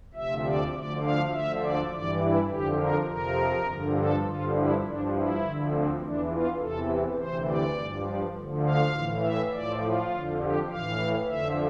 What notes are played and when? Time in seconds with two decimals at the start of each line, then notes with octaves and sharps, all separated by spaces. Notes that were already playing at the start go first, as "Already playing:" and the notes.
0.13 D2 C3 F3 E5
0.43 D5
0.72 D2 D3 F3 D5
1.01 F5
1.30 D2 D3 F3 E5
1.60 D5
1.90 G2 E3 D5
2.19 E4
2.47 F2 D3 F3 G4
2.77 A#4
3.06 F2 C3 F3 A#4
3.65 G2 D3 F3
3.95 A4
4.23 G2 D3 F3 F4
4.54 E4
4.82 G2 F3 D4
5.11 E4
5.40 D2 D3 F3
5.70 C4
5.99 E2 E3 D4
6.29 F4
6.58 E2 C3 E3 A4
7.17 D2 C3 E3 C5
7.45 D5
7.75 G2 F3
8.34 D2 D3 F3
8.64 F5
8.92 A2 E3
9.21 E5
9.51 A2 F3 D5
9.80 F4
10.09 F2 D3 F3
10.39 G4
10.68 A2 E3 F5
11.27 F2 D3 F3 E5